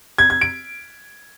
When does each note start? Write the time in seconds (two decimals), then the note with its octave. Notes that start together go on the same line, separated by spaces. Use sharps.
0.18 G#6
0.30 G#6
0.41 D7